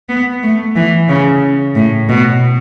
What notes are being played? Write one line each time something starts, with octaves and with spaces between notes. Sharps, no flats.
B3
A3
E3
C#3
A2
B2